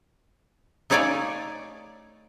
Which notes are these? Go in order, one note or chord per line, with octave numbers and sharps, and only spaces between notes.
A3 D#4 C#5 D5 F5 G#5